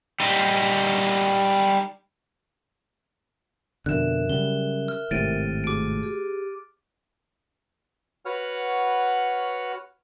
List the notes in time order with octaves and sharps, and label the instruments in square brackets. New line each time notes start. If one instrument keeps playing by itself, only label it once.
[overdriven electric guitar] G3 D#4
[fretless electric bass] F2 B2 D3 [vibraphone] A#4 E5 [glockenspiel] F#6 E7
[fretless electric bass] C#3 F#3 G3 [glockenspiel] G7
[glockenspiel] F6
[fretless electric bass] G#1 A2 C3 [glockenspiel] A6 D7 D#7
[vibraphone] A3 F#4 G#4 [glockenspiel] D6 D7
[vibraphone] G4 G#4
[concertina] F#4 B4 C#5 F#5 F6